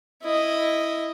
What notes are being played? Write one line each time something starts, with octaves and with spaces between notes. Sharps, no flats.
E4 D#5